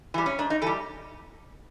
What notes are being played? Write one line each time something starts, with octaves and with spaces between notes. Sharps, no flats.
E3 G3
C#4
G#2 D4
D#4
E3 G3 A4